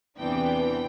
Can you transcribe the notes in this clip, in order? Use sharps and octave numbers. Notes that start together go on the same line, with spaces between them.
E2 C3 E3 B3 D4 G5